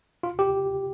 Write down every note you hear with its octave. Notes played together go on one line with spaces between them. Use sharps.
F4
G4